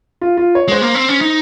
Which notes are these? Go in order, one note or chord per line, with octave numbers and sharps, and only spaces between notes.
F4
F4
C#5
G#3 C5
A#3
C4
C#4
D#4